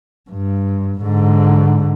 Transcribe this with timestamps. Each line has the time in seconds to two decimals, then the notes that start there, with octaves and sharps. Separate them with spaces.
0.30 G2
1.01 G#2 D3